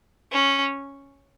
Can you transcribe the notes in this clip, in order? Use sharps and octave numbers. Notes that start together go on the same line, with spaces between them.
C#4